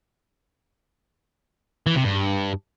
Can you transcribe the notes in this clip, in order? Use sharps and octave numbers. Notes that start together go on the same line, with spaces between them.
E3
C3
G2